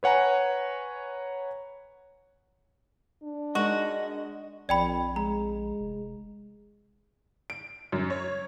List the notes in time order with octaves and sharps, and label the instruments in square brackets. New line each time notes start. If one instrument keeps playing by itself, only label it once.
[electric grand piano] B4 C#5 F#5 G#5 A#5
[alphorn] D4
[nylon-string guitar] G#3 D#4 A#4 [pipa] F#4 [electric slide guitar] D#5
[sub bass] A#1 [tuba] F2 [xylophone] D5 G5 B5
[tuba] G#3 [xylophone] A#5
[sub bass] F1
[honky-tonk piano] D7
F#2
C#5